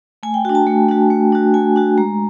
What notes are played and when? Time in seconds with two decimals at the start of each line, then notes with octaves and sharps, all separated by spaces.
0.23 A3 G#5
0.34 G5
0.45 F#4 G5
0.49 D4
0.55 A5
0.67 A3
0.89 D4 F#4
1.10 A3
1.32 D4 F#4
1.54 A3 G#5
1.76 D4 F#4
1.98 G#3 A#5